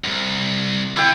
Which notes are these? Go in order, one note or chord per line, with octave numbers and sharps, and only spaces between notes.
C2 F#2
D3 E4 G5